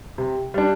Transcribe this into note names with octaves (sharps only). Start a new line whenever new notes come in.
C3
G3 D4